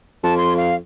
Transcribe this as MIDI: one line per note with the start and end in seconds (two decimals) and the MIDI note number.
0.24 0.76 41
0.24 0.36 81
0.38 0.54 84
0.57 0.75 77